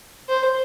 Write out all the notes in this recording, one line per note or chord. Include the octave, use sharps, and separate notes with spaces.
C5